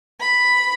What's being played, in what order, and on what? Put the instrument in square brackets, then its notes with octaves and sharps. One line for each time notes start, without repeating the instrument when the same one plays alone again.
[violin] B5